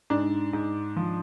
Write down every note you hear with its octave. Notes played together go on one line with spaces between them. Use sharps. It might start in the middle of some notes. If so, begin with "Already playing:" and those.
G#2 D4
G#2
F3